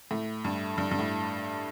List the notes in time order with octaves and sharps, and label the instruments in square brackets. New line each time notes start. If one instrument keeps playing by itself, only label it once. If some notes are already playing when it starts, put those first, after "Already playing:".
[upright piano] A2
G2
G2
G2
A2